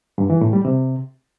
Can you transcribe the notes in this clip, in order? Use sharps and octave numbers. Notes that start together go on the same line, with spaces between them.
G2
E3
A2
G3
C3